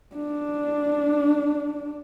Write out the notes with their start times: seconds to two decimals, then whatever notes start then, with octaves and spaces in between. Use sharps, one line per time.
0.16 D4